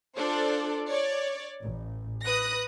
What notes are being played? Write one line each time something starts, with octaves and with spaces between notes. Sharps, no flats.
D4 F4 A4 C5 D5
C#5 D5
A1
B4 D#6 F#6 A#6